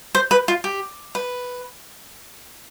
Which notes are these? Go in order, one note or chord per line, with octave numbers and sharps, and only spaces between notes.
C5
B4
F4
G4
B4